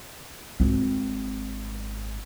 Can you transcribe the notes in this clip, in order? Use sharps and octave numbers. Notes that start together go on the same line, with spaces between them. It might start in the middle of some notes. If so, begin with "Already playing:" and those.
G#1 C4